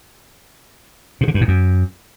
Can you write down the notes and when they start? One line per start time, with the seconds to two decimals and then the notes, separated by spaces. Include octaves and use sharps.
1.21 C3
1.28 D3
1.34 G2
1.41 A2
1.48 F#2